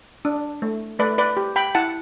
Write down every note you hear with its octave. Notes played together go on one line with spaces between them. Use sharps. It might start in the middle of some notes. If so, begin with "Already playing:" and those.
D4
A3
A3 B4 D5
B4 D5
G4
G5 B5
E4 F#5 A5